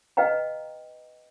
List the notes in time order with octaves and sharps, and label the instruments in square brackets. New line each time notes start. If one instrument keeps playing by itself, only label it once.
[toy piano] B4 D#5 F5 G5 A#5